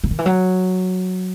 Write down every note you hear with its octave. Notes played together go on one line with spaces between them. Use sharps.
C#3
D#3
E3
F#3